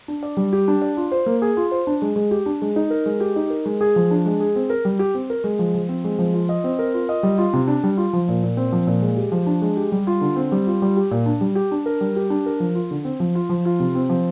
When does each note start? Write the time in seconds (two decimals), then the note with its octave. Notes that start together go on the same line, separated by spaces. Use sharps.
0.08 D4
0.23 D5
0.37 G3
0.53 G4
0.68 D4
0.82 D5
0.97 F4
1.12 C5
1.26 A#3
1.42 G#4
1.57 F4
1.72 C5
1.87 D4
2.02 G#3
2.16 G#3
2.31 G4
2.46 D4
2.62 G#3
2.76 D#4
2.90 A#4
3.06 G#3
3.20 G4
3.36 D#4
3.50 A#4
3.66 G#3
3.81 G#4
3.96 F3
4.11 D4
4.26 G#3
4.40 G#4
4.56 C4
4.70 A#4
4.85 G3
4.99 G4
5.15 C4
5.30 A#4
5.44 G#3
5.59 F3
5.74 F3
5.89 C4
6.04 G#3
6.19 F3
6.34 F4
6.49 D#5
6.64 C4
6.79 A#4
6.94 F4
7.09 D#5
7.23 G3
7.38 F4
7.53 C3
7.68 D4
7.84 G3
7.97 F4
8.13 F3
8.28 A#2
8.43 A#2
8.57 C4
8.72 F3
8.87 A#2
9.02 G#3
9.17 G4
9.32 F3
9.47 D4
9.62 G#3
9.77 G4
9.92 G3
10.07 F4
10.21 D3
10.36 C4
10.52 G3
10.67 F4
10.82 G3
10.97 G4
11.11 A#2
11.26 D4
11.41 G3
11.55 G4
11.72 D4
11.86 A#4
12.01 G3
12.16 G4
12.30 D4
12.46 A#4
12.60 F3
12.75 F4
12.91 D3
13.05 C4
13.20 F3
13.35 F4
13.49 F3
13.65 F4
13.80 C3
13.95 C4
14.09 F3